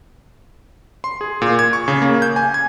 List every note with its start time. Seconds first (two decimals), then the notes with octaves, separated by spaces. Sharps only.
1.04 C6
1.21 G#4
1.42 A#2
1.59 G#6
1.73 C#6
1.88 C#3
2.02 A#3
2.22 G6
2.36 G#5
2.54 G#6